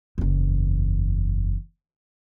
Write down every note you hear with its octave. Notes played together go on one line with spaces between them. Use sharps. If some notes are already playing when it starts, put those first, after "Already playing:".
F#1 E2